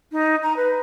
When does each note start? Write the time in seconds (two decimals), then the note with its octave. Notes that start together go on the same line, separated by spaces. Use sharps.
0.12 D#4
0.43 A#5
0.56 B4